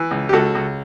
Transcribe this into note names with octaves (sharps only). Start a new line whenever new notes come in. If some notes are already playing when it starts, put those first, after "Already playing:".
Already playing: E3
C#2
G4
C#2 F#4 A4
C#2